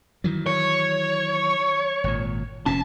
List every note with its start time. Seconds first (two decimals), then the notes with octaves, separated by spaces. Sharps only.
0.24 D#3 E3 F#3
0.46 C#5
2.04 G#1 A#2
2.66 F1 A#2 C#4 A5